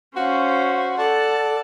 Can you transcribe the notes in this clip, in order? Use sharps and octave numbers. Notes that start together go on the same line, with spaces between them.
C#4 F#4 C5 F5
A4 D5 F#5 A5